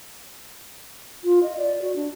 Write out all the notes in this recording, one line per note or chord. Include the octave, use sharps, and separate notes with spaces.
F4
D#5
D5
F#4
D4